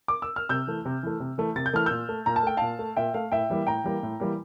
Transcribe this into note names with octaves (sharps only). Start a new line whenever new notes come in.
D6
E6
F6
C3 E6 G6
E3 A3
C3
E3 A3
C3
E3 A3
C3 A6
G6
E3 A3 F6
A#2 E6 G6
A3
A#2 A#5
A5
A3 G5
A#2 F5 A5
A3
A#2 E5 G5
A3 F5
A2 E5 G5
E3 G3 A#3
A2 G5 A#5
E3 G3 A#3
A2
E3 G3 A#3